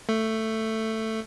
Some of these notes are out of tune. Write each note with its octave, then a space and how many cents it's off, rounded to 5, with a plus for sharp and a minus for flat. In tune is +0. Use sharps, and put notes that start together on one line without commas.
A3 +10